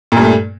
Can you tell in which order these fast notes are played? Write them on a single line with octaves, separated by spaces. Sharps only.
A#2 G2 A3